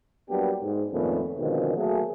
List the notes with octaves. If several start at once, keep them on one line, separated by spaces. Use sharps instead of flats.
F#3 G3 A#3 B3 D4 G4
G#2
F2 A#2 D#3 A3 B3 C#4
B2 D3 D#3 F3 G#3 C4
F#3 A3 A#3 G#4